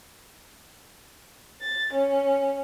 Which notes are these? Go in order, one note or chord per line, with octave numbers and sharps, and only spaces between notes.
A6
C#4